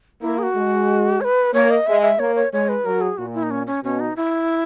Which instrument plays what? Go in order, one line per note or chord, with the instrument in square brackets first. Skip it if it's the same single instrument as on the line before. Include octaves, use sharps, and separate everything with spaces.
[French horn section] A#3 [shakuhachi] E4
[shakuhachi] G#4
F#4
[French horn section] G#3
[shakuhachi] C#5
B4
[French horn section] A#3 [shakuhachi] C#5
[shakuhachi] D#5
[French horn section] G#3 [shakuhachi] E5
[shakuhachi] E5
[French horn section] A#3 [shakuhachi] C#5
[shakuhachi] C#5
[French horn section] G#3 [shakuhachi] C#5
[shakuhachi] B4
[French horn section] F#3 [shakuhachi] A#4
[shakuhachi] G#4
[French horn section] A#2 [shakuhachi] F#4
[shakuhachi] E4
D#4
C#4
C#4
[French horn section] B2 [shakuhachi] C#4
[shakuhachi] D#4
E4